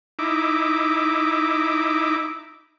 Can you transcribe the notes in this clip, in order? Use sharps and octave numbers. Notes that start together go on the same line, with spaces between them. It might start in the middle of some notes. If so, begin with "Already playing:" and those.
D#4 E4 D6